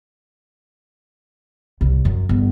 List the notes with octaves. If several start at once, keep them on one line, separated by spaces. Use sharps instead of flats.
C2
F#2
G1 G2